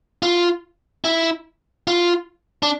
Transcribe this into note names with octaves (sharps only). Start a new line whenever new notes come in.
F4
E4
F4
D4